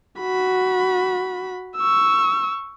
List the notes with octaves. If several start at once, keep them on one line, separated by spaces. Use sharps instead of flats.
F#4 B5
C#6 E6